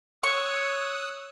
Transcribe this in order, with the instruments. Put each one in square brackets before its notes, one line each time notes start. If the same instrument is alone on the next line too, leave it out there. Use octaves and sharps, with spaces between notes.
[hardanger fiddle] C#5 [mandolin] C#6 [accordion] D#6 E6 F#6